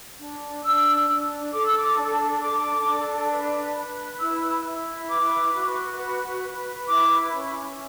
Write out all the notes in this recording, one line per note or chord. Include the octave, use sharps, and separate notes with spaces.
D4
D4 E6
D4
A4 D6
E6
D6
D4
A4 D6
D4
B4
B4
E4 E6
E4
B4 D6
F#4
B4
B4
E4 D6
C#4